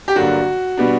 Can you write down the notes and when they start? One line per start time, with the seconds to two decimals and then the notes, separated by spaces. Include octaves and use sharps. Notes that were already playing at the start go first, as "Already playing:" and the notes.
0.08 G4
0.15 G2 D3 F#3 A#3 D4 F#4
0.77 B2 G3 B3 D4